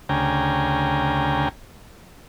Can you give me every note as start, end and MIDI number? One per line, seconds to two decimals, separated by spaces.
0.09 1.49 38
0.09 1.49 49
0.09 1.49 79
0.09 1.49 80
0.09 1.49 82